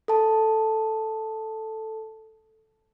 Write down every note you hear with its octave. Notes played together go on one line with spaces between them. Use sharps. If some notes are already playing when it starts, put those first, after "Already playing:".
A4 A5